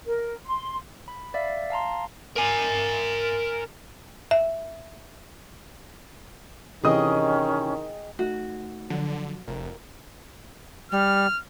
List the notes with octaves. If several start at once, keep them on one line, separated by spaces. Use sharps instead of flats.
A#4
C6
B5
D5 E5 F5
F5 A5 A#5 C6
A#4 G#5
E5
C3 D#3 E3 C#4 G#4 D#5 G5 D#6
A3 D#4 F#4
D3 F3 F#3
F1 A#4
G3 F6